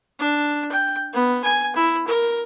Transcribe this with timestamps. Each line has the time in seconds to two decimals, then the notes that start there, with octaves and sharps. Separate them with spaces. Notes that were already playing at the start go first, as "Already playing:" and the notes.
0.19 D4
0.72 G5
1.13 B3
1.44 G#5
1.76 E4
2.07 A#4